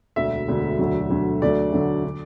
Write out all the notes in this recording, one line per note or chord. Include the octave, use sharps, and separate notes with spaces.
E1 D2 D3 E5
E1 D2 D3
E1 D2 D3 F#3
E1 D2 D3 F#3
D2 D3 F#3 A3 D5
D2 D3 F#3 A3
D3